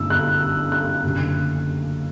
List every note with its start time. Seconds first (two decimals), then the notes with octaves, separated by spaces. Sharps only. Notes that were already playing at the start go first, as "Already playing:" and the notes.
Already playing: G1 F#2 D3 A3 E6
0.10 F#6
0.72 F#6
1.03 F#1 F#2 D3